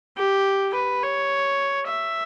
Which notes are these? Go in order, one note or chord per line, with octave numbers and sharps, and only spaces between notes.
G4
B4
C#5
E5